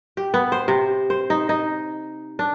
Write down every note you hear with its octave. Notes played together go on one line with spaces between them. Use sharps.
G4
B3
C5
C3
C5
D#4
D#4
D4